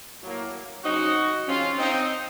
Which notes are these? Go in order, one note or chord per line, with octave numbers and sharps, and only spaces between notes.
A2 F#3 A#3
C#3 F#3 C4 D#4 F#4
C#3 F3 C4 C#4 F4
C4 D#4